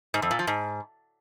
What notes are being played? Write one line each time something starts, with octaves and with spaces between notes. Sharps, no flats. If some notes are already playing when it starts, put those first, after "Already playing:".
G#2
F2
A#2
F3
G#2